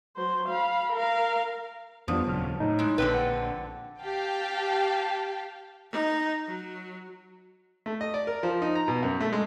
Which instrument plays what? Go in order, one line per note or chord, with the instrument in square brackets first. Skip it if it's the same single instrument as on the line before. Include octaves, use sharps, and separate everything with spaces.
[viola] F#3 C5
F5 B5
A#4 F5
[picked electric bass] F2 G3 [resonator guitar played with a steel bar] F3 [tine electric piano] B3 D4 F4
[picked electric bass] D#1 F#3 [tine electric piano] C#3 F6
[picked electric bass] A2 [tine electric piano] D#4 C#5
[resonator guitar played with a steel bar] G#3 E4
[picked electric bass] A#1 [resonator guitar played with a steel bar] D3 C4 B4
[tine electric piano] F#5 A5
[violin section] G4 F5 G5 A5
[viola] D#4
F#3
[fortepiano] A3
D#5
D5
A#4
F3
D#4
A#5
B2
F#2
A3
G#3